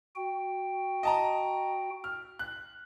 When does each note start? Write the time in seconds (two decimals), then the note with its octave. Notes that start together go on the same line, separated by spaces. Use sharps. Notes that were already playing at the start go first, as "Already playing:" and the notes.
0.16 F#4 G5
1.03 D#5 A5 A#5
2.04 F6
2.39 F#6